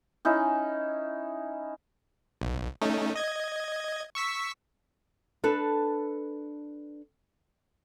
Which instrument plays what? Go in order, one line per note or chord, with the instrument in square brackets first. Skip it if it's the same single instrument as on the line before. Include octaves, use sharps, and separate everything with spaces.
[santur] C#4 D#4 E4
[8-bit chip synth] B1
A3 C#4 D#4
D#5 G#6
C#6 E6 B6
[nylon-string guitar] D4 A4 B4